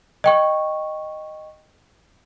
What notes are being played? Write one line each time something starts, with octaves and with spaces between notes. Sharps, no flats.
D#5 G5 C#6